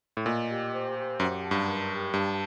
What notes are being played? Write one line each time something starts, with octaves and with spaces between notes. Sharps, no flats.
A2
A#2 D#5
G4
C5
G4
F#2 F#5
A5
G2
A#4
G4
G2 A5